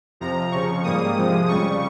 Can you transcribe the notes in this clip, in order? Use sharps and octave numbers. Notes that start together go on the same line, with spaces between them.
F2 C3 F3 A#5
F2 C#3 F3 C#6
G#2 G3 A#3 D#6
C3 F3 G#3
F2 C#3 G3 C#6